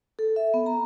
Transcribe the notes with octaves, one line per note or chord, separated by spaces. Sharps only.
A4
E5
B3
A#5